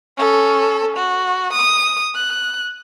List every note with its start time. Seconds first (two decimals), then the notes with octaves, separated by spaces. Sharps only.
0.18 C#4 A4
0.97 F#4
1.53 D#6
2.15 F#6